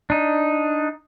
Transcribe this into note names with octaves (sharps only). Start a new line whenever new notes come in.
D4 D#4